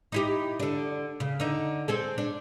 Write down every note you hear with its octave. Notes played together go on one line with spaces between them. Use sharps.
D#4 E4 G4
D3 D4
C#3
D3 D#4
C4 G#4 A4
D4